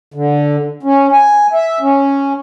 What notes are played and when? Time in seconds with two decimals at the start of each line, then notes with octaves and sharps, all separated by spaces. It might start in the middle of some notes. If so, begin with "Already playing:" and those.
0.14 D3
0.83 C#4
1.12 G#5
1.53 E5
1.81 C#4